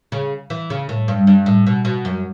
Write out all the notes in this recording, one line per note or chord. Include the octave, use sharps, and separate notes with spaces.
C#3
E3
C#3
A2
G2
G2
A2
B2
B2
F#2